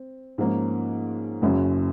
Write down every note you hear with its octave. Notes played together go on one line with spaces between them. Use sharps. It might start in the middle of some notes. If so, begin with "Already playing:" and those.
Already playing: C4
G#2 F3 A#3 C#4
F#1 F#2 C#3 F#3 C#4